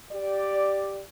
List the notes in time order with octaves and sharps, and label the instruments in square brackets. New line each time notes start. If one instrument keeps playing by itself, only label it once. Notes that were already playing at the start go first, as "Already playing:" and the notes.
[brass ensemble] G4 D5